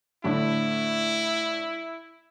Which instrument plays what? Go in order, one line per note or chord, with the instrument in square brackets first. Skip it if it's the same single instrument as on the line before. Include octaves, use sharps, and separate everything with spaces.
[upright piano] A2 D3 [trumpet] E4